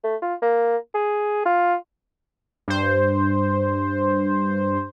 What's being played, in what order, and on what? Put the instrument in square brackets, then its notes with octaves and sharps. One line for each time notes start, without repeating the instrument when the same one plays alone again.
[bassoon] A3
F4
A#3
G#4
F4
[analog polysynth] G2 C5